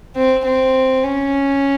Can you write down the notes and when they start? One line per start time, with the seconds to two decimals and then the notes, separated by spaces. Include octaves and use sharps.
0.16 C4
0.45 C4
1.03 C#4